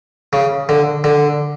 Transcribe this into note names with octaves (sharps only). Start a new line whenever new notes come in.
C#3
D3
D3